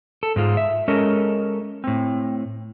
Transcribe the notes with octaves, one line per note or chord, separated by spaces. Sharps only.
A4
G#2 G#3 F4
E5
G#3 C#4 A4 A#4 D#5
A2 C4